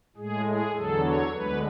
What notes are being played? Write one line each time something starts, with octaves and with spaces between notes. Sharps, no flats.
A2 G#3 G#4
G#4
E2 D3 F#3 A4
C#5
D2 D3 G#3 B4